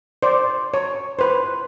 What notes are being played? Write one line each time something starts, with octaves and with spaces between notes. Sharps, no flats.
C5 D5
C#5
B4 C5